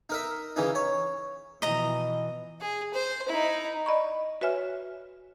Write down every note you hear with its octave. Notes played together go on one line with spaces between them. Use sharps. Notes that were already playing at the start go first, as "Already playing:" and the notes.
D#4 A#4 E5
C#3 E3 D#4
C#5
B2 E3 F3 D#5 A#5
G#4
C5
D#4 E4
D5 D#5 B5 C#6
F#4 B4 C#5 E5 G#5 F6